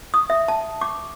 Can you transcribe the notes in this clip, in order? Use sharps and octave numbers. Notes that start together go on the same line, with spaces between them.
D#6
E5
A5
D6